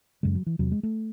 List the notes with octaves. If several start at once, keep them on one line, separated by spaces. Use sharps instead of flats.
F#2 C#3 G#3
F#3
E3
E2 C3 F#3
G#3
A3